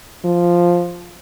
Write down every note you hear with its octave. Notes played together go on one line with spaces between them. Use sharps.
F3